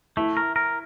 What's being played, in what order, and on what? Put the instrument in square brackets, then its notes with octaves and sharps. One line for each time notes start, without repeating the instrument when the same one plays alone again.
[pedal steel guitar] A3 [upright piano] E4
[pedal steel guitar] A#4
A#4